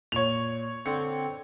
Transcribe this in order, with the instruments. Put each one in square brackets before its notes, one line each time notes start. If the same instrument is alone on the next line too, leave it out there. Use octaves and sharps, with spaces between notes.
[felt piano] A#2 [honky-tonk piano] C#5 F7
[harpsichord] D3 C4 [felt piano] C#7